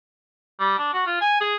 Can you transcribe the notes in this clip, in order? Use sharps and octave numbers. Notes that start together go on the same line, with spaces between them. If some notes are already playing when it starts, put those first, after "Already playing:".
G3
D4
F#4
F4
G#5
G#4